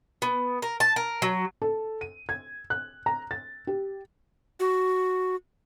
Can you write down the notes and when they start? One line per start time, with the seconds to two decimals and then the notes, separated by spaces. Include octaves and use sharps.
0.22 B3
0.62 A#4
0.80 A5
0.96 A#4
1.22 F#3
1.62 A4
2.01 D#7
2.29 G#6
2.70 F#6
3.06 A#5
3.31 A6
3.67 G4
4.60 F#4